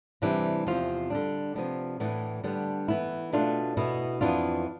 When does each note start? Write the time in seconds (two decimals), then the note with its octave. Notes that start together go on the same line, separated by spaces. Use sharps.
0.22 C3 E3 G3 D4 G4
0.66 E2 C3 F3 C4 F4
1.10 D3 G3 D4
1.56 C3 F3 B3 D4
2.00 A2 E3 B3 D4
2.44 D3 G3 B3 D4
2.88 E3 B3 E4
3.33 B2 A3 D4 F4
3.77 B2 B3 E4
4.21 F2 E3 B3 D4 F4